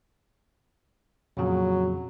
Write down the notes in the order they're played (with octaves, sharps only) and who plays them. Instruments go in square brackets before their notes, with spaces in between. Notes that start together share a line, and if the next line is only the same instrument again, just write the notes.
[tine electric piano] F2 A#2 C#3 [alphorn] F#3